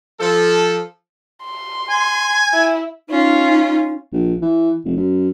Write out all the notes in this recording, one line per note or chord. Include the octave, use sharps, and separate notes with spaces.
F3 A4
C6
G#5
E4
C#4 D#4 F4
A#1
E3
F1
F#2